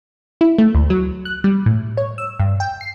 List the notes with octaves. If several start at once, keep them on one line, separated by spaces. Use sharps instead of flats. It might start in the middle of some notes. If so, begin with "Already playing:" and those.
E4
A3
D2
F#3
F#6
G3
A2
C#5
E6
G2
G5
C7